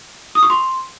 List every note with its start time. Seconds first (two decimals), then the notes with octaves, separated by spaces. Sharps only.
0.35 D#6
0.43 C#6
0.50 C6